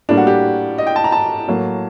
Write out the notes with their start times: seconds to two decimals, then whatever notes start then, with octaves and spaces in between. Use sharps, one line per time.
0.09 A2 G3 A#3 D4
0.17 F#4
0.27 G4
0.78 D#5
0.87 G5
0.96 A5
1.04 A#5
1.12 A5
1.48 A2 F#3 A#3